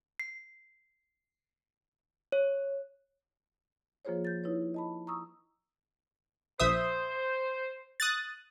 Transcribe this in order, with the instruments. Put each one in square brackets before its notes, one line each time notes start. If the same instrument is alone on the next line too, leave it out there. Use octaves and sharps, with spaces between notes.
[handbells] C7
C#5
[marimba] F3 A#3 F4 G#4 C5 C#5
G6 A6
D#4 E4 B4 C#5
D#5 A5 B5
A#5 C#6 D#6 E6
[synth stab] A#1 E5 D#6 [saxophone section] C5
[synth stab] D#6 F#6 A6